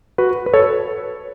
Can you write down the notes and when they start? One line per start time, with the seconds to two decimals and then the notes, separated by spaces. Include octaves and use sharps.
0.18 F#4 B4
0.46 B4
0.53 A4 C#5